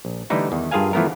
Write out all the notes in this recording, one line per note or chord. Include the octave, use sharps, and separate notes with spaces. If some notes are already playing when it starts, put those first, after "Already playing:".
A#1
D3 E3 G3 A3 D#4 E4
E2 D#3
G2 F4 G#4 A#4 F5 G#5
E3 F3 A3 B3 A#4